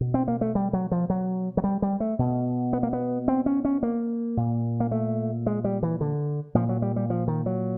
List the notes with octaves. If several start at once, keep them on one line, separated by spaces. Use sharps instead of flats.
B2
C4
A#3
A3
G3
F#3
F3
F#3
F#3
G3
G3
A3
B2
B3
A#3
B3
C4
C#4
C#4
A#3
A#2
A#3
A3
G#3
G3
E3
D3
A#2 F3
F#3
G3
G3
F3
D#3
F#3